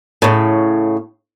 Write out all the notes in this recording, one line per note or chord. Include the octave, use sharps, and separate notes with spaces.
A2 C#3